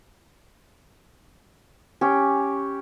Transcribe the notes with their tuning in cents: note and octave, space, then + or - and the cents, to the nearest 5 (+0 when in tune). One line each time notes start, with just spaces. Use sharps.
C#4 +0 G4 +0